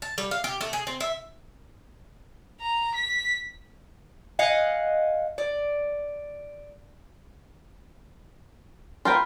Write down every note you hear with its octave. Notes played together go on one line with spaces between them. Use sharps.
A5
G3
F5
G4
A3
G#4
C4
E5
A#5
B6
D#5 F5 F#5 G#5
D5
F4 A#4 B4 G5 C6